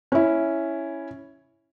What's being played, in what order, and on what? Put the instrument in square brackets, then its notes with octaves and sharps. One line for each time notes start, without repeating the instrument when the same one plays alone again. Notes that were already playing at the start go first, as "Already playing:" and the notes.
[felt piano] C#4 E4